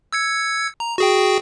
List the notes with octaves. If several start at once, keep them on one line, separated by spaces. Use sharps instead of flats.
E6 G#6 C#7
A#5
F#4 G#4 G5